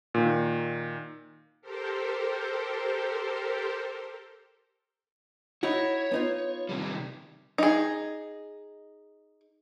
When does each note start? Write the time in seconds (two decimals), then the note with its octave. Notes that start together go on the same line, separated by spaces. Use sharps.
0.14 A#2 D#3
1.62 G4 A4 A#4 C5
5.63 D#4 E4 F#4 C#5
6.12 B3 D#4 F4
6.69 C3 D#3 G3
7.58 D#4 G#4